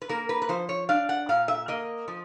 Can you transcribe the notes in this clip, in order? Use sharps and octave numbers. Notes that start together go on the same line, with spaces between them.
B4
A#3 A#4
B4
B4
F3 C5
C#5
D4 F5
F#5
A#2 F5
E5
A#3 D#5
F3